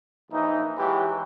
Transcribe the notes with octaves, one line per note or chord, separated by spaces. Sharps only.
A#1 E3 D#4
E3 F#3 G#3 G4